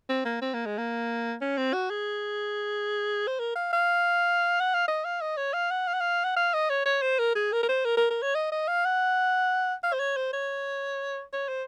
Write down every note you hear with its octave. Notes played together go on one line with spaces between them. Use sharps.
C4
A#3
C4
A#3
G#3
A#3
C#4
C4
F#4
G#4
C5
A#4
F5
F5
F#5
F5
D#5
F5
D#5
C#5
F5
F#5
F5
F#5
F5
F#5
F5
D#5
C#5
C#5
C5
A#4
G#4
A#4
A#4
C5
A#4
A#4
A#4
C#5
D#5
D#5
F5
F#5
F5
C5
C#5
C5
C#5
C#5
C5